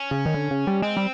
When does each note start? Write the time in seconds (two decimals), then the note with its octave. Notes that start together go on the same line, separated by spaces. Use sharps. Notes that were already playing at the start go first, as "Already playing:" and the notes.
Already playing: C#4
0.11 C#3
0.26 D#3
0.34 D3
0.51 C#3
0.67 G3
0.82 G#3 C4
0.97 G3